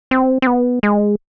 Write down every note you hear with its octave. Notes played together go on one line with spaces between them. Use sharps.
C4
C4
B3
G#3